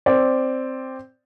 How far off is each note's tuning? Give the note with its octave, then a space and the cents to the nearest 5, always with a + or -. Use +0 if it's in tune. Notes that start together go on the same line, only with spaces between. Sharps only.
C4 +0 D5 +0